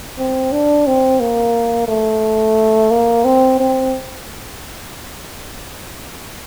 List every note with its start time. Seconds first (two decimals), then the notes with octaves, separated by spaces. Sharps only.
0.18 C4
0.52 D4
0.87 C4
1.20 A#3
1.88 A3
2.91 A#3
3.24 C4
3.60 C4